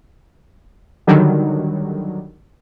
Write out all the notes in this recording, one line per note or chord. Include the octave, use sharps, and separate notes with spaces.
D3 D#3 F#3 G3